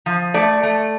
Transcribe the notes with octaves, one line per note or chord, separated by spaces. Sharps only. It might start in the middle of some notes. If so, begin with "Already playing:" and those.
F3
A3 D5
A3